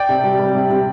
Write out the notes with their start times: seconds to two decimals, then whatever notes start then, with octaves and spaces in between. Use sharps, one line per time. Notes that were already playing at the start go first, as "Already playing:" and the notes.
Already playing: D5 G5
0.09 C3
0.24 G3
0.39 G3
0.55 C3
0.70 C3